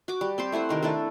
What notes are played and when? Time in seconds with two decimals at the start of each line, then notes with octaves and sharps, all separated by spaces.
0.08 F#4 D6
0.21 G3
0.38 C4 G4 C5
0.52 A3 E4 C5 F#5
0.69 C3 D#3 A#4
0.83 A3 D4 E4 A4